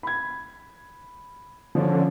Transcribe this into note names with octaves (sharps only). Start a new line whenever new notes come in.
B5 G#6
D3 F3 C#4